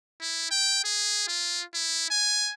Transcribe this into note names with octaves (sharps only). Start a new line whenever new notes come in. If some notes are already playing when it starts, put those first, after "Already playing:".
E4
G5
G#4
F4
E4
G#5